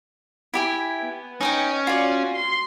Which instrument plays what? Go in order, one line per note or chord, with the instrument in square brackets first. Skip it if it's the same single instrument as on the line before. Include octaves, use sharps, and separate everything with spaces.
[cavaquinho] E4 G4 G#5
[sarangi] B3
[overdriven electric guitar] C#4 [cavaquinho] D#4 D#5 G5
[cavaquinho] F4 D5 [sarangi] F#4
[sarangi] C6